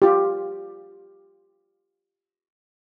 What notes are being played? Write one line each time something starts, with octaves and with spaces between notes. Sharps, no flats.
F4 G4